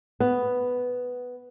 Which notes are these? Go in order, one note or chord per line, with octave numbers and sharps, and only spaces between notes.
B3